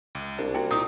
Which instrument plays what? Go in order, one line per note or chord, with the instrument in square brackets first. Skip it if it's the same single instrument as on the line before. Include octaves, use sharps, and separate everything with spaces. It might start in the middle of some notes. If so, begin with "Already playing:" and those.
[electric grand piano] C#2
[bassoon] C2 [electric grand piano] D4
[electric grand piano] A#3 [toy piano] E4 F#4 G5
[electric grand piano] A#2 D#4 [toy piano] A#5 D#6